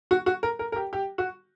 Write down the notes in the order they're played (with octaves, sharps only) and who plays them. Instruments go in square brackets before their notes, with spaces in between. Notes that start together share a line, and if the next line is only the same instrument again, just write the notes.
[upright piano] F#4
F#4
A#4
A#4
A#4
G4
G4
F#4